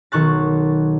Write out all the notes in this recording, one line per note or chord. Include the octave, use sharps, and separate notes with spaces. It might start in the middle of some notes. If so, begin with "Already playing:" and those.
B1 D#3 C#6 F#6 A6